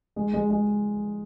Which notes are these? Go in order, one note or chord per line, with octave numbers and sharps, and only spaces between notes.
G#3
G#3
G#3